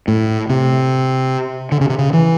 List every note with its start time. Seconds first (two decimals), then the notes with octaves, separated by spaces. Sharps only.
0.08 A2
0.50 C3
1.72 D3
1.81 C#3
1.90 C3
1.98 C#3
2.13 E3